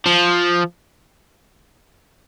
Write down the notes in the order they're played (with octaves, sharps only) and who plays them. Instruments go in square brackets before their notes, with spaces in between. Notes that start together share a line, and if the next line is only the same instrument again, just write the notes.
[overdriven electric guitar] F3